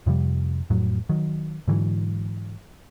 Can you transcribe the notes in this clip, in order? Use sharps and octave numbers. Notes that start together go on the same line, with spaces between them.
F2 C3 F3 G3
F2 A2 F#3
D#3 F#3
G#2 D3 E3 F#3